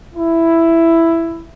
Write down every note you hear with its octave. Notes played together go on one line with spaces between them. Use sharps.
E4